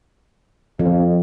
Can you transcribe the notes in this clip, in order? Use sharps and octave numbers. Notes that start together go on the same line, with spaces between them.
F2 F3